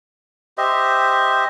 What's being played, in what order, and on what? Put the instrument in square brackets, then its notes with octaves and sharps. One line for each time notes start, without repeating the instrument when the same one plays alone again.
[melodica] G4 C5 D#5 E5